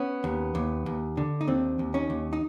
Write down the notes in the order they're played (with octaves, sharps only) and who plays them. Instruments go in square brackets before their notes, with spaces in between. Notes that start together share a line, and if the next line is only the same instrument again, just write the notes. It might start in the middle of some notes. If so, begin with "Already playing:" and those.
Already playing: [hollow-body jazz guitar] B3 C#4
D#2
D#2
D#2
D3
D#4
D#2 C4 D4
D#2
C#4 D#4
D#2
D#4